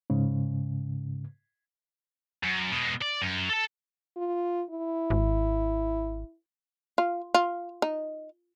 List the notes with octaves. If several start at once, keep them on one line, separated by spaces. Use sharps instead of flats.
G#2 C#3
F#2
B2 G#3
D5
F#2
A4 A5
F4
E4
G#1
F4
F4
D#4